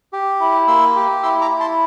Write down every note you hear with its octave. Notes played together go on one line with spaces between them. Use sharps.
G4
E4
A#3 C6 E6
G4
E4 C6 E6
A#5 D6
E4
A5 C6